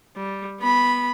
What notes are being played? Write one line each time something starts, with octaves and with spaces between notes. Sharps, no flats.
G3
B3 B5